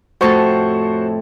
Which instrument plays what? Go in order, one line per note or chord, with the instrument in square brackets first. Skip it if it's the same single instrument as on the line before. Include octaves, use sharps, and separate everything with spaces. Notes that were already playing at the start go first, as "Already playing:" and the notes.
[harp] F2 A2 A4 [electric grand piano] F#4 C5 C#6